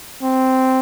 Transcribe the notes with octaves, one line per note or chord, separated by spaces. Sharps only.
C4